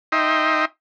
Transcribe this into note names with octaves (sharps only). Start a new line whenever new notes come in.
D#4 D#5 E5 G5 C6